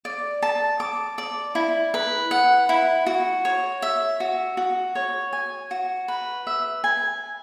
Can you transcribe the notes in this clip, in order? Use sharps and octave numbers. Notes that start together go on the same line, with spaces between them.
D5
A5
D6
D5
E4
B4
F#5
E4
F#4
C#5
E5
F#4
F#4
C#5
G#5
F#4
B4
E5
G#5